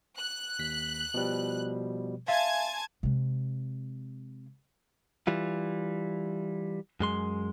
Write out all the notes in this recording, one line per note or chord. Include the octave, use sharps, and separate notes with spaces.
F#6
D#2 B6
B2 F3 G3
E5 F5 G#5 A5 C6 G#6
C3 G#3
E3 G3 F4
F#2 G#3 C6